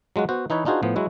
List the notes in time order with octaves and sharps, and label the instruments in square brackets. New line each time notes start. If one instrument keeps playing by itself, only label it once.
[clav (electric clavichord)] F#3 G#3 F4 F#4
B3 F#4 C5
E3 D#4 E4 B4 C#5
D4 D#4 F4 F#4 G#4 C5
A2 F3 B3
F#3 G#3 E4 F#4